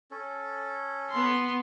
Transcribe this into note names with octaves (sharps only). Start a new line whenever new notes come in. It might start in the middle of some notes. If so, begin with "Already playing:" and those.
C#4 A4
B3 C6